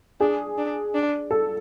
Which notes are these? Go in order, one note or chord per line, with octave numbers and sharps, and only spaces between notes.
D4 G#4
D4
D4
A4